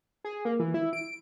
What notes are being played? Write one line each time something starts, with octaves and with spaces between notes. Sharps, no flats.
G#4
A#3
E3
E4
D7